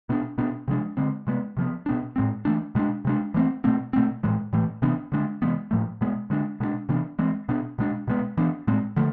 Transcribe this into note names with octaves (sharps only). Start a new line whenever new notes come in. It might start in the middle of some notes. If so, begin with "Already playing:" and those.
B2 B3 D4
B2 B3 D4
C3 F3 G#3 D4
D3 G#3 C4
C3 G#3 B3
C3 F3 B3
B2 B3 D4
A2 G#3 C4
E3 A3 D4
B2 G#3 B3 D4
C3 G#3 D4
E3 A3 C4
B2 A3 C4
B2 A3 C4
A2 E3 G#3
A2 E3 A3
C3 E3 B3 D4
D3 G#3 D4
C3 E3 G#3 B3
A2 F3 A3
B2 G#3 B3
D3 G#3 D4
B2 G#3 B3 D4
C3 E3 B3 D4
E3 G#3 C4
B2 B3 D4
B2 G#3 D4
B2 G#3 B3
E3 B3 D4
A2 G#3 C4
D3 F3 A3